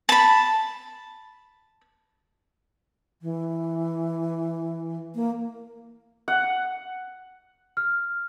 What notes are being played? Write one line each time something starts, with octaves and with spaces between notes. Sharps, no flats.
A5 B5
E3
A#3
F#5
F6